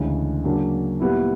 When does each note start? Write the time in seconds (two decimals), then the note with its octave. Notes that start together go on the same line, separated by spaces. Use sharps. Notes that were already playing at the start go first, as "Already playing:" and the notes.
Already playing: D2 C#3 E3 G#3
0.44 C#3 F#3 A#3 D4
1.00 A#2 G3 B3 E4